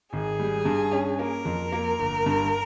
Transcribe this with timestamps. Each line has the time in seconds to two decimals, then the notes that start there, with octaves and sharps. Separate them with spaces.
0.13 G#1 G#4
0.39 G3
0.65 G2
0.92 C#4
1.19 A#3 A#4
1.45 F2
1.72 A#3
1.99 G1
2.26 G2